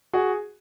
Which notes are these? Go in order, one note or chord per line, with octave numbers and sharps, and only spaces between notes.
F#4 G#4